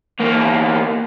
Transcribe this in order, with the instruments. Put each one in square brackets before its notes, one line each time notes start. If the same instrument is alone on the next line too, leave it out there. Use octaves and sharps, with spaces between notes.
[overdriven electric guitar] E2 A#3